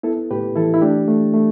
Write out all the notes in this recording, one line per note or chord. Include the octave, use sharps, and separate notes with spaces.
B3 E4 A4
A2 G4 B4
E3 E4 A4
E4
A3 D4 G4
A3
A3